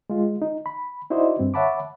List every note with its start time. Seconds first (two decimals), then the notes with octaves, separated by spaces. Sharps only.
0.10 G#3 F4
0.42 D#4
0.66 B5
1.10 D#4 E4 F#4 C5 D5 D#5
1.39 G2 C4
1.54 C#5 E5 F#5 A5 B5 D6